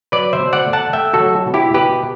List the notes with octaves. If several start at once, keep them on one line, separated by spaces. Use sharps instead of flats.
F#3 B4 D5
C5 E5
B2
D5 F#5
A3
F#5 A5
A3 E5 G5
F#4 A4
F#3
B2
E4 G4
B2 G4 B4